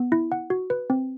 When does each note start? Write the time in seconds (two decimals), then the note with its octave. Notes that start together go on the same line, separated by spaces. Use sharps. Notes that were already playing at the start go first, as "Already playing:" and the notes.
Already playing: B3
0.12 E4
0.32 F#5
0.50 F#4
0.70 B4
0.90 C4